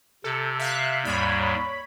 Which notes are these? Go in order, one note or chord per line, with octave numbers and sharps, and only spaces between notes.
C3 A4
E5 F5 F#6
D#2 G#2 G3 C#5 B5